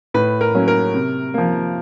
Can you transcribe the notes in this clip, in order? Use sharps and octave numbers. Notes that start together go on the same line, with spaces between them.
A2 B4
A#4
F#3 A#3 C#4
A#4
C3
F3 A#3